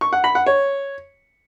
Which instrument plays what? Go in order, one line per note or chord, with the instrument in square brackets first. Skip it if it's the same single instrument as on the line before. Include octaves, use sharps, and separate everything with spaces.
[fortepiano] C#6
F#5
B5
F#5
C#5